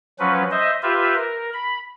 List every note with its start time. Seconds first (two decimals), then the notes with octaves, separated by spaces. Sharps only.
0.19 F3 F#3 C#4 B4
0.51 C5 D#5 E5
0.83 F4 G4 B4 E5
1.15 A#4
1.53 B5